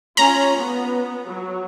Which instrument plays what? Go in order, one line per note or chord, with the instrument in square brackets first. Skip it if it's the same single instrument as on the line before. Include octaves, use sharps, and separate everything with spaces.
[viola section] C#4 F4 [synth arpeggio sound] A#5
[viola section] B3
F#3